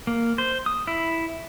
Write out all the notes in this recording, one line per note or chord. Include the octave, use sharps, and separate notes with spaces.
A#3
C5
D#6
E4